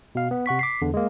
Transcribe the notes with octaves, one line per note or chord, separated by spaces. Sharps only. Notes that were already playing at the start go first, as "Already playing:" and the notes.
B2 F5
B3
C3 F#5 C#6 B6
D6 B6 C7
E2 D3
G#3 A#3